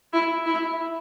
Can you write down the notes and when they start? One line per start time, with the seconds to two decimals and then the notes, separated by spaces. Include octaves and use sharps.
0.13 E4
0.46 E4